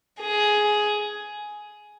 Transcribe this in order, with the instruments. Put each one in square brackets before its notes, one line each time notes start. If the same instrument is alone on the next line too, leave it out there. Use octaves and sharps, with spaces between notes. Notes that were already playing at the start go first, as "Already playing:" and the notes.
[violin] G#4